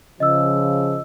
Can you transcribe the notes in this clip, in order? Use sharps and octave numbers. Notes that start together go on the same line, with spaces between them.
C#3 F3 D#5 E6